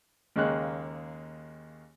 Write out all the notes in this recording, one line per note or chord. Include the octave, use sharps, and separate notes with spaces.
D#2 C#3 G#3 A#3 G5 F#6